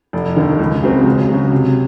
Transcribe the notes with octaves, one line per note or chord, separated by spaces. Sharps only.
F1
D#2 D#3
C#2
C#3 F#3 C4
C#2
C#3 F#3
C3